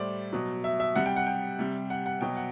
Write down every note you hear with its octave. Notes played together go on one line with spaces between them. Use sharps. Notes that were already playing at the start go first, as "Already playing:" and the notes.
Already playing: A2 G3 C5 D5
B2 F#3
E5
E5
C3 G3 F#5
G5
F#5
G5
C3 G3
F#5
F#5
B2 F#3 G5
F#5